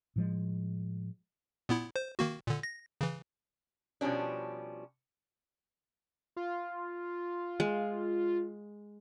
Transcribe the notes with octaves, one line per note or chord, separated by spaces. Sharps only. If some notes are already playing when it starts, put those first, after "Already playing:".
A2 F3 G#3
A#2 B3 E4
C5
D#3 A#3 F#4
A#2 D3
A#6
C#3 E3
B2 F3 G3 C#4 D4
F4
G#3